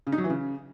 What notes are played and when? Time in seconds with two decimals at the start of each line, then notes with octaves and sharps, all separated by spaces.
0.07 C#3
0.12 D#4
0.18 F#3
0.24 E3
0.30 C#3